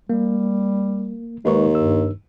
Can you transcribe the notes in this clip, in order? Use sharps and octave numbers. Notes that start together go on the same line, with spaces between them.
G3 A#3
D#2 G#3 D#4 B4 C#6
G2 E6